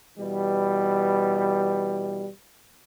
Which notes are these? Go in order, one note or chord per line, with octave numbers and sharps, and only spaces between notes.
B2 E3 G3